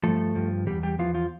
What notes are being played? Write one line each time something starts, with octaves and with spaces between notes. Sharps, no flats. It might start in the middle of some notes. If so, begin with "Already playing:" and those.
G2 F3 A3 A4
G2 F3
E2 E3 G3 G4
G3 G4
E2 E3 F3 F4
F3 F4